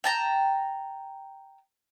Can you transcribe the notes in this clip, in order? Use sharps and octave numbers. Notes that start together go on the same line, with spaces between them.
G5 A5 A#5